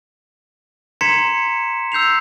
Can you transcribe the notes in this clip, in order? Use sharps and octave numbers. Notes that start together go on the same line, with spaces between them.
A#5 C6 G#6 B6 C#7 E7
E6 G6 C7 F7